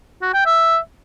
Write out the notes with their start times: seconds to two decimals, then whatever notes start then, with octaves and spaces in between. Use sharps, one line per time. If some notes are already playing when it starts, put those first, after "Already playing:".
0.22 F#4
0.34 G5
0.46 E5